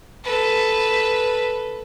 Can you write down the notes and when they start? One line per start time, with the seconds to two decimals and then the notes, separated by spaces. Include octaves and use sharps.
0.24 A4 B4